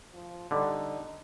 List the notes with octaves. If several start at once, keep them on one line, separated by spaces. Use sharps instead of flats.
F3
D3 G3 D#4